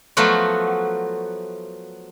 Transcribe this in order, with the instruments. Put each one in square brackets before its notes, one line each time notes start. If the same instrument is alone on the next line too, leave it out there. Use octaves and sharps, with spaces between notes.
[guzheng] F3 F#3 A3 B3 F4 F#4